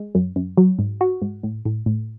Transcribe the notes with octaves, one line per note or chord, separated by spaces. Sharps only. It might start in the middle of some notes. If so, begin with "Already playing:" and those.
Already playing: G#3
F#2
F#2
F#3
G#2
F#4
G#2
A2
A2
A2